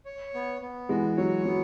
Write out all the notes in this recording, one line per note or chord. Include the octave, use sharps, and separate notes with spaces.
C#5
B3
B3
E3 G#3 F#4
F#3 C#5
F#3 B3